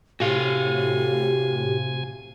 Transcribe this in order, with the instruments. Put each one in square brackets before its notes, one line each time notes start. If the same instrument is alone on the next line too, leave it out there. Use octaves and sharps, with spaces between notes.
[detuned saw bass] A2 [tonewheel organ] C3 G#5 [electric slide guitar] F#4 F5 [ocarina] G4